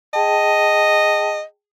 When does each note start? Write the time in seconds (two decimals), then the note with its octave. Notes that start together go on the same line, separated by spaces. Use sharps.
0.13 G#4 D#5 G5 A5